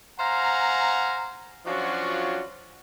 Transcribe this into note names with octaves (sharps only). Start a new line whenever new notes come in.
C5 F5 F#5 G#5 A#5
F3 F#3 C#4 D4 F4 F#4